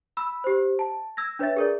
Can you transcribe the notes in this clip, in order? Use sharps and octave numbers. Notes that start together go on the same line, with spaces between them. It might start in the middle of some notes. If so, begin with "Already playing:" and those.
B5 E6
G4 C5
A5
E6 G#6 A#6
D4 B4 C#5 E5 A6
G#4 A#4 D5